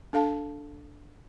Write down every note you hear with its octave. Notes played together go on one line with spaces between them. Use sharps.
D4 A4 F5 A5